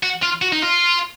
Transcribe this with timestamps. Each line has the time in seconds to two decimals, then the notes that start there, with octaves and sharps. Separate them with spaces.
0.03 F#4
0.23 F4
0.42 F#4
0.52 D#4
0.62 F4